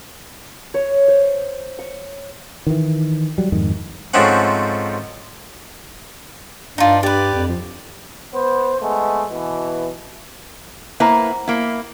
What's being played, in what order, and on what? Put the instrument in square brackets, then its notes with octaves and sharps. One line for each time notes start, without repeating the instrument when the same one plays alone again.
[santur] C#5
C5
C#6
[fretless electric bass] D#3 E3
F#3 G3
F2 G#2 D#3
[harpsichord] G#2 F3 A3 C4 C#4 F#5
[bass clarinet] G2 [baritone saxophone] D4 [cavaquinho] D#4 F4
[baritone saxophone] G4 [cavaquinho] B4 D5
[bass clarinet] F2
[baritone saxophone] F3
[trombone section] B3 C5
G#3 A3 B3
B2 E3
[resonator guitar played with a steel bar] A#3 E4 B4 [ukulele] C5 F#5 A#5
[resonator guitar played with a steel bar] A#3 E4